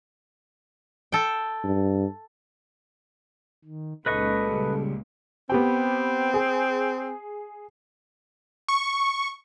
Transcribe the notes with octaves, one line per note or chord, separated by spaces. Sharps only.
A4 G5
G2
D#3
C#2 A#2 D#4 A4 B4 D#5 C#6
C#3 G3 G#3
B3 C4 G4 G5
G#4
C#6